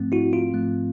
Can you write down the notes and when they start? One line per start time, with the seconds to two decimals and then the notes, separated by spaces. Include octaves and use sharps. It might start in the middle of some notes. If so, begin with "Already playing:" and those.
Already playing: G#2 F3 A3 C4
0.12 E4 F#4
0.33 F4
0.54 G#2 F3 A3 C4